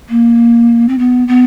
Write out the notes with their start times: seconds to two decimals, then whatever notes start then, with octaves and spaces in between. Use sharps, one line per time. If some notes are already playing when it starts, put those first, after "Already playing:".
0.09 A#3
0.88 C4
0.98 B3
1.28 B3